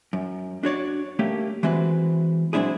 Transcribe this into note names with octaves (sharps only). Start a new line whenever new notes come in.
F#2
D4 F#4 C#5 D5
A3 A#3 C#4 G4
E3 G#3 C4 F#4 B4
F#3 G#3 C4 D4 E4 G#4